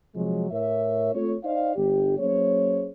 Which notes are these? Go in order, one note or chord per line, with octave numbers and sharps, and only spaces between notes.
C3 F3 F#3 G#3
A2 A#4 C#5 E5
A3 C4 F4 A4 C#5
D#4 C5 D5 D#5 F5
G1 G4
F#3 A#3 C#4 G#4 C5 C#5